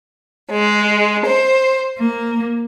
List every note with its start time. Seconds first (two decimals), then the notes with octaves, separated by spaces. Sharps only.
0.52 G#3
1.26 C5
1.99 A#3